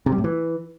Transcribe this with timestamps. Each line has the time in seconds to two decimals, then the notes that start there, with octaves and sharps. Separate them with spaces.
0.06 C3
0.12 G3
0.18 A2
0.24 E3